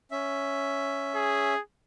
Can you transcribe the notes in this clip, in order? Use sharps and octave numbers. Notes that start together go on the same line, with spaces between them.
C#4 E5
G#4